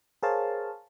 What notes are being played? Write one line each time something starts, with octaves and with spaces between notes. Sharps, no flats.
G#4 A#4 C5 C#5 F5 A5